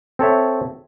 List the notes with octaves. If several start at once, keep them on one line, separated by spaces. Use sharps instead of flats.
C4 A4 C#5 E5